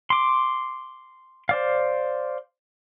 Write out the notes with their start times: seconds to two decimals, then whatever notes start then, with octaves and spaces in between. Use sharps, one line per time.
0.10 C6 D6
1.49 C5 D5 F5